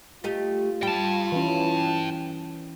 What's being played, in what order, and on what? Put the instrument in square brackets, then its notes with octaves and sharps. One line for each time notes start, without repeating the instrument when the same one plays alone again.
[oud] A3 G4 D#5 [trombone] F4
[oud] G3 [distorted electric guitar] G5 A5
[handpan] E3 C#4